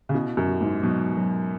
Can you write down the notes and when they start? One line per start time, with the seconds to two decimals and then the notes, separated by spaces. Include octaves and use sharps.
0.09 C#3
0.14 B2 E4
0.37 F#2
0.49 F#3
0.61 G#2
0.83 B2 F#3
1.17 F#3